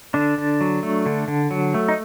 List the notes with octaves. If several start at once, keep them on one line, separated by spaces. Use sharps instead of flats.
D3 D4
D3
F#3
A3
D3
D3
F#3
A3
D#4